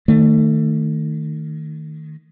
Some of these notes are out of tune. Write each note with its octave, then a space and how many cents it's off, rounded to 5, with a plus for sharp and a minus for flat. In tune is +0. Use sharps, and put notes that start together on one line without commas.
D#3 +0 A3 +20